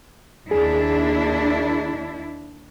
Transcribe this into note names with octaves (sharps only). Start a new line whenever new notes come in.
D#2 D4 E4 G#4